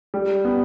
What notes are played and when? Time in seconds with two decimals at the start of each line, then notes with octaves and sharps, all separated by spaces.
0.14 G3
0.45 B3